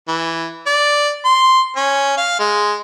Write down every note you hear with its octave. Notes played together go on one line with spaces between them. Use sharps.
E3
D5
C6
C#4
F5
G#3